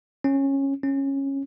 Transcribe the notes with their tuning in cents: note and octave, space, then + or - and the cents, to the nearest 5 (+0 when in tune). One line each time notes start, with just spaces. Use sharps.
C#4 -15
C#4 -15